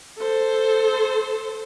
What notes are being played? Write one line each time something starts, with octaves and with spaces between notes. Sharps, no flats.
A4 C5